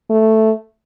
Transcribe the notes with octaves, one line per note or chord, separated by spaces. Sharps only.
A3